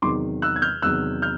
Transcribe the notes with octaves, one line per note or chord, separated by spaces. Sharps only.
E2 C3 D#3 F#3 C6 D6
E6 F#6
G#6
F6 G6
E2 C3 D#3 F#3 E6 F#6
F6 G6